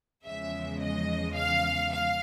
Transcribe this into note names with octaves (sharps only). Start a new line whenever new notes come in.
E2 C#3 F3 G#3 E5
D#5
F5
F5